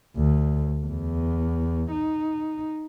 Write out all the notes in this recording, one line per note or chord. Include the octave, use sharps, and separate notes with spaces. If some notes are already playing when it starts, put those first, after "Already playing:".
D2
E2
D#4